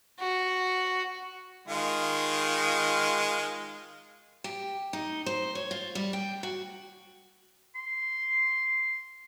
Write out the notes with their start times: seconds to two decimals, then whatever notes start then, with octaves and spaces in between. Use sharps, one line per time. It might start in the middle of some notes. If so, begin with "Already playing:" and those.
0.20 F#4
1.68 D#3 G#3 F4
4.44 G4
4.93 D#4
5.26 C5
5.55 C#5
5.71 F4
5.95 G3
6.13 G5
6.43 F#4
7.75 C6